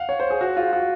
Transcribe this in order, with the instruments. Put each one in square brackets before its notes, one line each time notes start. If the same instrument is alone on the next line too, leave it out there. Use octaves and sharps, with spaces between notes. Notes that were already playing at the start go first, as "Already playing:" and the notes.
Already playing: [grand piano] F5 F#5
C#5
C5
G#4
F#4
F4
F#4